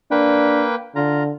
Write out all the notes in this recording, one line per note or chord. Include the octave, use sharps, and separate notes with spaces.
A#3 D4 B4 G5
D3 F4 A#5